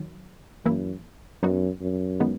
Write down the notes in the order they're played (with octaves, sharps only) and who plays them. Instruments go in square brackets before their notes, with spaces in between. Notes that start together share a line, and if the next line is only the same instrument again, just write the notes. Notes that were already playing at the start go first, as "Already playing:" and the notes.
Already playing: [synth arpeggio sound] D#3 F#3
[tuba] F#2 [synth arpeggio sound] E3 A#3 E4
[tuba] F#2 [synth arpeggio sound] F#3 B3 D#4 F#4
[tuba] F#2
[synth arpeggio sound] D#3 G#3 B3 D#4